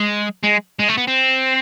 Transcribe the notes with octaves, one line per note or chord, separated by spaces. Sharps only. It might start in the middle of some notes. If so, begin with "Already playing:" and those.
Already playing: G#3
G#3
G#3
A3
B3
C4